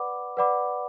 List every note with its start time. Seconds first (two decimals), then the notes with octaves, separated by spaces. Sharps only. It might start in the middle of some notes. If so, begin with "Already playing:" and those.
Already playing: B4 D5 F#5 B5 D6
0.37 B4 D5 F#5 B5 D6